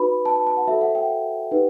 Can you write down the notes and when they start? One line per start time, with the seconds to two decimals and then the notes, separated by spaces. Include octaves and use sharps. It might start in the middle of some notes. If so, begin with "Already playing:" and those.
Already playing: D#4 F#4 B4 B5
0.25 A5
0.36 A5
0.47 A5
0.57 F#5
0.67 F#4 A4 C5 E5
0.81 F#5
0.95 G5
1.51 D#4 G4 B4